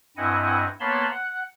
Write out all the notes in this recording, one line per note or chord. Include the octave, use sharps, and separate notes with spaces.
G2 C4 E4 D#5 F#5 G#5
A#3 B3 C#5 A5 B5 C6
F#5